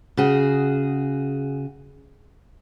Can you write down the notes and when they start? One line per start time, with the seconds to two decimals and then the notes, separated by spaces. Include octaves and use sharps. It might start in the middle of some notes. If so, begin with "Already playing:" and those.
0.17 C#3 F#4 G#4